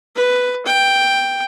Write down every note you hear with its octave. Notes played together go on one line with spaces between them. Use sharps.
B4
G5